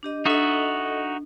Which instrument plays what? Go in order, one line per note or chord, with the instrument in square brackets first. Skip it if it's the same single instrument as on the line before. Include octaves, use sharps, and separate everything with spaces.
[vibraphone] D4 G4 D#5
[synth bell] D4 [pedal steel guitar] D#4 F#4 E5 [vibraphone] A4 D#5